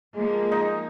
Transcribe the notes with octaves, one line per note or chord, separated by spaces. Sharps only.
F3 G#3 A#3
D#4